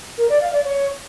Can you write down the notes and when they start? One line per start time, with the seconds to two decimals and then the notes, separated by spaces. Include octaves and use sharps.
0.17 A#4
0.29 D5
0.41 F5
0.52 D5
0.64 C#5